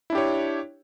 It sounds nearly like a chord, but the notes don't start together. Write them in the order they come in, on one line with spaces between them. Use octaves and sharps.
E4 D4 G4 C#5